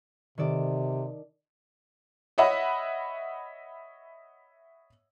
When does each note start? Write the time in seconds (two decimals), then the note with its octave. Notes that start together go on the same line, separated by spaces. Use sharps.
0.38 C3 D#3 A4 D5
2.38 C#5 D#5 E5 F#5 B5